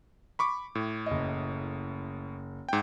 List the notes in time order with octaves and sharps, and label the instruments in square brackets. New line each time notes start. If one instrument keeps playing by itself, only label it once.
[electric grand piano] B5 C#6 D6
A2
[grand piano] F#1 D#5
[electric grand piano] G#2 G5